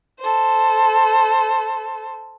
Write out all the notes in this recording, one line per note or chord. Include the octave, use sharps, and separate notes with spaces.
A4 C5